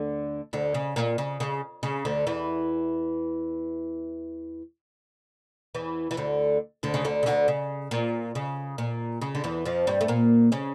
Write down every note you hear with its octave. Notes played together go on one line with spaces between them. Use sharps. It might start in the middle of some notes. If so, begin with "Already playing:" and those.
Already playing: D2 D3
D2 D3
C#3
A#2
C#3
C#3
C#3
D2 D3
E2 E3
E2 E3
E3
D2 D3
D2 D3
C#3
D2 D3
C#3
D2 D3
C#3
A#2
C#3
A#2
C#3
D3
E2 E3
F2 F3
G2 G3
A3
A#2 A#3
C#3 C#4